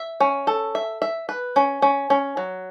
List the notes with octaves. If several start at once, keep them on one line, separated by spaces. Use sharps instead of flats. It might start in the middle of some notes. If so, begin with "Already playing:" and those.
Already playing: E5
C#4
A4
E5
E5
B4
C#4
C#4
C#4
F#3